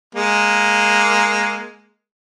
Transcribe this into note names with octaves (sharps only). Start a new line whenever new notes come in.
G#3 A#3